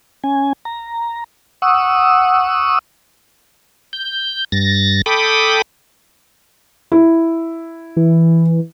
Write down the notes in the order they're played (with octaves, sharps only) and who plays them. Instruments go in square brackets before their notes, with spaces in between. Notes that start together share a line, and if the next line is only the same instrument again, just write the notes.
[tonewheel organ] C#4 G#5
A#5
F#5 C#6 D#6 E6
G6
G2 A6 A#6
A4 G5 B5 D6 D#6
[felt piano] E4
[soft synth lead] E3